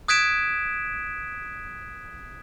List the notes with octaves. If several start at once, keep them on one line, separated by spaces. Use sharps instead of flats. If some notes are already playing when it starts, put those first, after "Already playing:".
D#6 F#6 G#6 B6 D7 E7